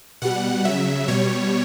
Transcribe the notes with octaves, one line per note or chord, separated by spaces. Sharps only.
B2 G3 F#5
C#3 F#3 E5
B2 G3 C#5